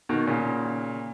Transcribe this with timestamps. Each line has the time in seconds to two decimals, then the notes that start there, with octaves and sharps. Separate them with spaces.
0.09 B2 D#3
0.27 A#2 C#3